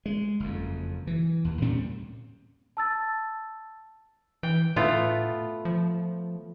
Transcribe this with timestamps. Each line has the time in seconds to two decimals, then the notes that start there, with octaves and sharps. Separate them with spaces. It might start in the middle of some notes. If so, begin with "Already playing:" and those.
0.06 G#3
0.40 F#1 F2
1.07 E3
1.45 D#2
1.62 A2 G3 C4 C#4
2.77 A5 E6 A6
4.43 E3 G5
4.76 A2 A3 B3 F4
5.65 F3